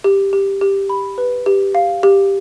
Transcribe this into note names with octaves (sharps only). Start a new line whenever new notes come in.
G4
G4
G4
B5
B4
G4
F5
G4